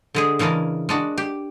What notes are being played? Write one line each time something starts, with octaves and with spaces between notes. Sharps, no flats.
D3 G#3 G#4
C#3 E3 G#3 D4 A#4
G#3 D4 F#4
G4